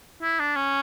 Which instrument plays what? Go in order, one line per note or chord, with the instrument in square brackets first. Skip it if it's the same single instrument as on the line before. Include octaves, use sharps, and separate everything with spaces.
[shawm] E4
D4
C#4